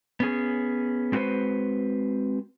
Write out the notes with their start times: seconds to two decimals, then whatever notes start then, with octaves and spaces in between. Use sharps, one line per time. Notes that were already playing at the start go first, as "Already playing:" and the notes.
0.20 B3 C#4 G#4
1.12 G#3 C4 F#4 A4 B4 C5